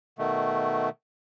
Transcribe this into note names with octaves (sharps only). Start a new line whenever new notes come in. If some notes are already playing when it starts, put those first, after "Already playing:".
B2 D#3 A3